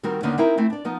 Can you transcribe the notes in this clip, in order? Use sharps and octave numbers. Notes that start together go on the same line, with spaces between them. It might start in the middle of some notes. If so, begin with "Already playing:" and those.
D#3 G3 C4 F#4 A#4
D#2 D3 A#3 B3 C#4 D#4
C4 D#4 E4 A#4
A3 C4 E4
D4 D5
F3 B3 D#4